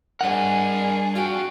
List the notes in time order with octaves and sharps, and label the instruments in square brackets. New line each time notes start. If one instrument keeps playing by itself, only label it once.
[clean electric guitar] G2 F#5 [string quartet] D4 G#4 [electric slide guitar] A#4 D#5 G#5
[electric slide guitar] F4 G5 [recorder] F#4